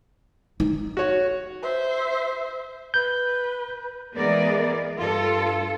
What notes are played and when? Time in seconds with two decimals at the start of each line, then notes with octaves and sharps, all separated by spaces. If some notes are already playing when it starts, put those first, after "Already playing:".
0.60 D#4
0.97 F#4 C#5
1.62 C5 E5
2.94 B4 G6
4.16 E3 G#3 B3 G#4 A#4 D5
4.96 G2 F4 A4